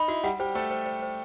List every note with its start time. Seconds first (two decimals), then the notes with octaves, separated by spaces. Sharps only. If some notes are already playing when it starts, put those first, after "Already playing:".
Already playing: D#4 B5
0.08 E4 F#4
0.23 G3 G4 F#5
0.39 G3 G4 C5
0.55 A3 A4 C5
0.71 C5
0.86 C5
1.02 C5